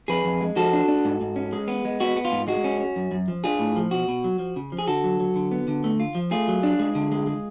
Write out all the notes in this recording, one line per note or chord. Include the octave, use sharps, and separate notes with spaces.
F2 G#4 B4
F2
G#3
F3 F#4 A4
D4
D4
G#2
G#2
C#4
G#3
B3
G#3
B3 F#4
B3
F4
G#2
G#3 F#4
C#4
C#4
F#2
F#2
F3
D4 F4 G#4
A2
F3
B2 F#4
B2
F#3
F3
C#3
F3
G#4
D3 F#4 A4
F#3
F#3
D3
B3
D3
A3
F4
F3
A3 F4 G#4
F#3
D4
G#3
D3
G#3
G#3